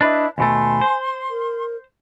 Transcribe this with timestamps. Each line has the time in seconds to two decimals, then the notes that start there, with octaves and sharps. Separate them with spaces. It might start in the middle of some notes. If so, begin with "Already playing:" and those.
0.01 D4 E4 B4 D#5 D6
0.38 D#2 B2 A3 G#5 C6
0.81 C5
1.30 A#4